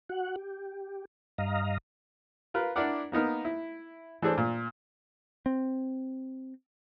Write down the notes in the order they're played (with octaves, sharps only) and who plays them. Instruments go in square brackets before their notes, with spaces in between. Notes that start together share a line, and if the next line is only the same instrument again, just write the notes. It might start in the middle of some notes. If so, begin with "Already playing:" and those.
[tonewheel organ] F#4 F#5
G4
G2 D#5 F5 A#5
[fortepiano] F4 A#4 B4
D4 E4 A#4 D5 F#5
A#3 B3 D#4 A#4
E4
E3 D4 G#4 A4 C5
A#2
[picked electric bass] C4